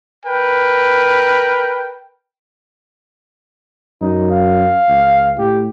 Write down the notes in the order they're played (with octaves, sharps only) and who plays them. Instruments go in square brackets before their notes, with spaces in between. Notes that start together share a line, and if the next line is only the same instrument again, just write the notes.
[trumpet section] A#4 B4 G5
[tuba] F#2 [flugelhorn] D#4
[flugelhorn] F5
[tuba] C#2
[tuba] A2 [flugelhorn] G4